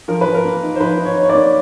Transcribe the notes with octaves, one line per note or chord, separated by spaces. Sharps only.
F3 A#4
F3 B4
A#4
A#3
D#4
C5
F3 B4
D#4
C#5
D#4
C#5
D5
A#3